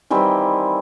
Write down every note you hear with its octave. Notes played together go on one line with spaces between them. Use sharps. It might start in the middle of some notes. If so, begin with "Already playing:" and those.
D#3 E3 G3 C4